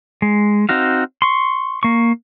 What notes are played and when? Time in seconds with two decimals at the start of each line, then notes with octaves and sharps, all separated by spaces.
0.22 G#3
0.69 C4 D#4 F#4 F5
1.22 C6 C#6
1.83 A#3 C#6